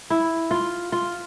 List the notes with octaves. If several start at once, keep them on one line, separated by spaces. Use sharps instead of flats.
E4
F4
F4